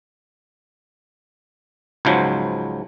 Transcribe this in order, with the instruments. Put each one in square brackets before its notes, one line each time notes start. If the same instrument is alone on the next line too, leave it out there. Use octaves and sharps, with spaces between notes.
[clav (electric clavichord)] C#2 G#2 F3 F#3